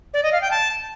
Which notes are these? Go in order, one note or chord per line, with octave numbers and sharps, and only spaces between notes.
D5
D#5
F5
G5
A5